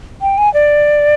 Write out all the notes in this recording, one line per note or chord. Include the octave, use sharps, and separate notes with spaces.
G5
G#5
D5